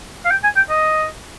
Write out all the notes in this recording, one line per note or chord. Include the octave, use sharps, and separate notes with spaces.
F5
G5
G#5
G5
D#5